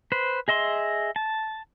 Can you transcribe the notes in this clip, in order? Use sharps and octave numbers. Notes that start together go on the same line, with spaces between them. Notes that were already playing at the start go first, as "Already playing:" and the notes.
B4 C5
G#4 D#5 E5 C6
A5